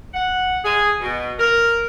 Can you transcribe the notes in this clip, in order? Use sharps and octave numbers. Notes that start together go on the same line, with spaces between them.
F#5
G#4
B2
A#4